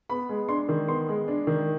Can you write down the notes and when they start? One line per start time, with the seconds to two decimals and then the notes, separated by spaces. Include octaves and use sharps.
0.09 B3 B5
0.29 G#3
0.49 D4 C6
0.69 D#3
0.88 B3 C6
1.08 G#3
1.28 D4
1.47 D#3